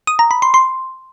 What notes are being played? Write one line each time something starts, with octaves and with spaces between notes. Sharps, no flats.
D#6
A#5
B5
C6
C6